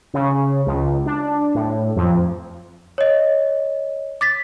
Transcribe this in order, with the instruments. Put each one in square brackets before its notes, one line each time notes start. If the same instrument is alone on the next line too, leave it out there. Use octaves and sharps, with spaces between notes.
[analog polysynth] C#3
C#2
D4
A2
F2
[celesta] C#5 D#5
D6 A6 B6